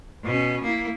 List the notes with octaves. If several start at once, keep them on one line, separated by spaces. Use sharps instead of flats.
B2 C#4
A#3 E4